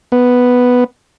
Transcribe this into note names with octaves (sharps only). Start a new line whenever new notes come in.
B3